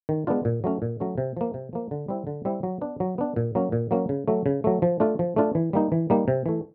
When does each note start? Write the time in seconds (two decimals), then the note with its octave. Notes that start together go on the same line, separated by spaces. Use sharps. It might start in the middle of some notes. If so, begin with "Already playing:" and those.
0.09 D#3
0.27 G#3 B3 D4 F4
0.45 A#2
0.64 F#3 A3 C#4
0.82 A#2
1.00 F#3 A3 C#4
1.18 C3
1.37 F3 A#3
1.54 C3
1.73 F3 A#3
1.91 D3
2.08 G3 C4 E4
2.27 D3
2.45 G3 C4 E4
2.63 F#3
2.81 B3 D4
3.00 F#3
3.18 B3 D4
3.36 A#2
3.55 F#3 A#3 C#4
3.72 A#2
3.91 F#3 A#3 C#4
4.09 C#3
4.28 F#3 A3
4.46 C#3
4.64 F#3 A3
4.82 F3
5.00 A3 D4 F4
5.19 F3
5.36 A3 D4 F4
5.55 E3
5.73 G3 A#3 D#4
5.92 E3
6.10 G3 A#3 D#4
6.28 C3
6.46 E3 A3